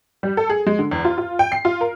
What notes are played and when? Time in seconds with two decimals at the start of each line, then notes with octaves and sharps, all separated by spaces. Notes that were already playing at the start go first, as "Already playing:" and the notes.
0.23 G3
0.37 A4
0.50 G#4
0.67 G#3
0.79 D3
0.91 E2
1.05 F4
1.18 F4
1.39 G5
1.52 C7
1.65 F4
1.81 A#4